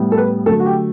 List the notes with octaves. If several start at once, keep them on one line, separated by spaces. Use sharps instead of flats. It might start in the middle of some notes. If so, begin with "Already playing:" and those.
Already playing: A2 G3 B3
A4
B4
D3 F#3 A3 A4
F#4
G4